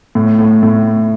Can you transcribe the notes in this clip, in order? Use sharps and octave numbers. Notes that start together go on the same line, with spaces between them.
A2
A2
A2